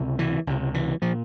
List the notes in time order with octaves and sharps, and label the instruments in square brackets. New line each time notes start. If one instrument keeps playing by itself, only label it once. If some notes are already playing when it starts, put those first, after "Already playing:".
Already playing: [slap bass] C#2 C3
E3
C#2 C3
E3
A#2 F3